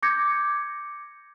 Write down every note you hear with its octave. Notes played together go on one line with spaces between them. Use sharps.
D6 G6 G#6 A#6 C#7